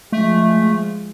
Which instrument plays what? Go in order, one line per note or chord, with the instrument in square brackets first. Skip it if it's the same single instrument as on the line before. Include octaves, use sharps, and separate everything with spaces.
[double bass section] F3 G#3 [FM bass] A3